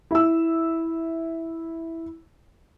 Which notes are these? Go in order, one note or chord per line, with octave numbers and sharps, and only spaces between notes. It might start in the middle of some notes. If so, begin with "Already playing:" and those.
E4 E6